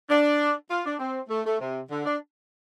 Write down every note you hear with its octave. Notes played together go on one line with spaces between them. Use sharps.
D4
F4
D4
C4
A3
A3
C3
D3
D4